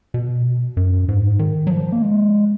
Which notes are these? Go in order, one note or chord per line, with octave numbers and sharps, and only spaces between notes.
B2
F#2
G#2
D#3
F#3
F3
A#3
G#3